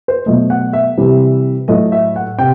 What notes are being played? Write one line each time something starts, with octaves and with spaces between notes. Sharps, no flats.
C5
B2 F#3 A3 D#5
F#5
E5
C3 E3 G3
A2 F#3 A3 D#5
E5
F#5
C3 G5